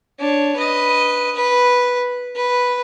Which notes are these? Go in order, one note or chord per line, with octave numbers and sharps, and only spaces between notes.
D4 C#5
B4 D#5
B4
B4